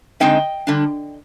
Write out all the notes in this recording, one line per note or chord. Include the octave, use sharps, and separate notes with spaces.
D3 G#3 C4 D#4 D#5 G5
D3 G3 D4